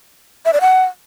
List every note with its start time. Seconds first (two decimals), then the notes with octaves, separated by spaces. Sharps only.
0.45 E5
0.53 D5
0.61 F#5